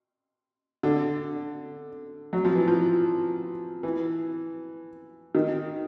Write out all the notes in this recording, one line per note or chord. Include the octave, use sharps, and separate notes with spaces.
D3
F#3
F3
E3
F3
E3
D#3